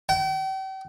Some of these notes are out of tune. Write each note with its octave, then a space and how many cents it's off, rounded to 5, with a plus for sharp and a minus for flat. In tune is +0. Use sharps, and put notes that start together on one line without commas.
G5 -40